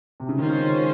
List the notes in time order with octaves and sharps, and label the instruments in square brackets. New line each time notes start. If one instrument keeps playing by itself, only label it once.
[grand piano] C3
C#3
[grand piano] D#3 [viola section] G#3 C#4 F4 C5